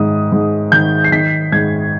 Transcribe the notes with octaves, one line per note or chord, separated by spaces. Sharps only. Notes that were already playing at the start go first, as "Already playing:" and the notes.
Already playing: G#2 D#3 D#6
G#2
D#3 G6
C7
D#3 B6
G#2 G#6